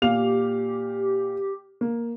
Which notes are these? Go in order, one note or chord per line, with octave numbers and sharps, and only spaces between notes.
A#2 G4 F5 F7
A#3